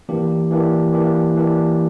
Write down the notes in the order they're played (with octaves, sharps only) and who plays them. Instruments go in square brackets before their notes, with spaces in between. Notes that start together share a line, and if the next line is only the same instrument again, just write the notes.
[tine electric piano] E3 A#3 D4 G4
E3 A#3 D4 G4
E3 A#3 D4 G4
E3 A#3 D4 G4